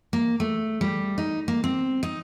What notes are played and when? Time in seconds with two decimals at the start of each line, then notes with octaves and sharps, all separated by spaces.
0.13 A#3
0.40 A3
0.81 G3
1.18 D#4
1.48 A#3
1.64 C4
2.03 D#4